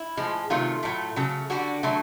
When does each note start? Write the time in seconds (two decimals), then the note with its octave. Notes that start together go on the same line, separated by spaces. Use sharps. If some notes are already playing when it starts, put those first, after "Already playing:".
Already playing: E4
0.17 A2 F3 G#3
0.50 C3 D#3 F#3 A3 F4
0.83 A2 F#3 A3
1.16 C#3 F#3 A3
1.50 D3 G3 F#4
1.83 D3 F#3 A3